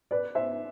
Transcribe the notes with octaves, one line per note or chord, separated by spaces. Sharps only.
B4 D5
C5 E5